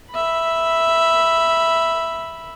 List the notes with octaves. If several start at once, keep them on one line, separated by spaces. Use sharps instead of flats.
E5 B5